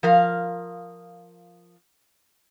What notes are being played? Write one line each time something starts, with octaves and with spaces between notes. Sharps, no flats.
F3 A#4 F5